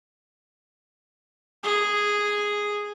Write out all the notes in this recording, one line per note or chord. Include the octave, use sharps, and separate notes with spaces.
G#4